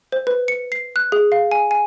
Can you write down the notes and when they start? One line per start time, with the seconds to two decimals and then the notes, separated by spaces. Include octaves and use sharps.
0.12 C5
0.27 B4
0.48 C#7
0.72 C7
0.96 F#6
1.12 G#4
1.32 F5
1.51 G#5
1.71 G#5